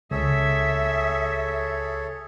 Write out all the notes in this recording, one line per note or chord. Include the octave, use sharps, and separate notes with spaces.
C#2 G#4 A4 C#5 E5